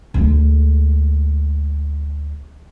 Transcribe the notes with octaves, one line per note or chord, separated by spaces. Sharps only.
D2 G#3